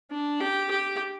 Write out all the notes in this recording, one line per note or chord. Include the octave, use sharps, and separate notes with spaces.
D4
G4
G4